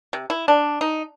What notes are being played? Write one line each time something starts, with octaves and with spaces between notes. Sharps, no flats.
C3
E4
D4
D#4